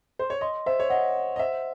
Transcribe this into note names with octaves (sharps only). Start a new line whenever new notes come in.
C5
C#5
D#5 C6
C5 E5
C#5
D#5 F#5
F#5
D#5
C5 E5